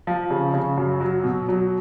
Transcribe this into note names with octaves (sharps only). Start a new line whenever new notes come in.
F3
C#3
C#3
F#2
F#3
B2
F#3